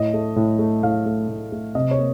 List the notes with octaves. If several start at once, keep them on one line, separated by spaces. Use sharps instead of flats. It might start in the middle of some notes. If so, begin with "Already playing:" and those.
Already playing: A2 D#5
A3
A2
A3
A2 F5
A3
A2
A3
C3 D#5
C#5
A#3